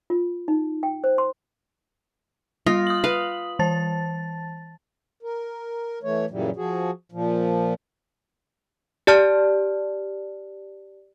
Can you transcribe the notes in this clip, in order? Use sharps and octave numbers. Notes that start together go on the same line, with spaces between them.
F4
D#4
G5
C5
C6
G3 F4 D#6 A#6
D#6 F#7
B4 F5
E3 A5 A6
A#4
E3 A3 C#5
F#2 A#2 C#3 E3 F#3 G3
F3 F#4 G#4
A#2 F3
G4 D5 A5 F6